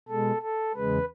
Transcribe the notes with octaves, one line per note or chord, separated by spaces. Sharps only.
B2 G#3 A4
A4
E2 C#3 G#3 B4